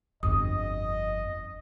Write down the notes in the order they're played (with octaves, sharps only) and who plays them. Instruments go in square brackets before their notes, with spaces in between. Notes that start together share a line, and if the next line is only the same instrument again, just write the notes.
[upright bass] G1 F2 [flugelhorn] D#5 [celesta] D#6